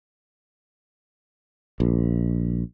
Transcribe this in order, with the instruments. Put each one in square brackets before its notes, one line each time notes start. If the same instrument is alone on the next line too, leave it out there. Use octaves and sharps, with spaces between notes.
[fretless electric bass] A#1